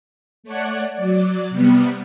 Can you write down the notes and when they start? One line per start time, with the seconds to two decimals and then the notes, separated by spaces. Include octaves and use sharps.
0.43 A3 C#5 D5 F#5
0.93 F#3 D5
1.50 C3 G3 B3